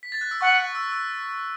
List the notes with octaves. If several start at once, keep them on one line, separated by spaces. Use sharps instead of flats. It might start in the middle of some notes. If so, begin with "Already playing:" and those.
B6
A6
F#6
E6
F#5 C#6
F#6
E6
E6